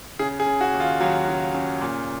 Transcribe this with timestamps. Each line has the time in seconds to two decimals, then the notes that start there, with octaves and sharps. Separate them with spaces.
0.19 C#3 G#4
0.40 G#4
0.46 C#3
0.61 F#4
0.74 D#2
0.80 F4
1.00 D#2 F#3
1.28 C#3
1.54 C#3
1.81 A#2